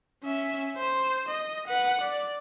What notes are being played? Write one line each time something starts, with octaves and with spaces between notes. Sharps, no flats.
C#4 E5
C5
D#5
B4 F#5
D5